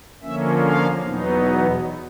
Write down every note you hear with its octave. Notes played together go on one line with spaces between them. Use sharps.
D3 F3 A#3 C#4 E5
F5
E2 B2 F#3 B3 D#4